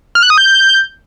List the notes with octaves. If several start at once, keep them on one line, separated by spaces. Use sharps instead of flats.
F6
F#6
D#6
G6